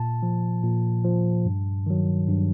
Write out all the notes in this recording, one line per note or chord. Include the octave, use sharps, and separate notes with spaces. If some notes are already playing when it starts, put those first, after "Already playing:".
Already playing: A#2 A5
F3
A#2
F3
G2
D#3 F#3
G2